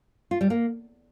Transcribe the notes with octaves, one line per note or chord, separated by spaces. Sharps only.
F4
G3
A#3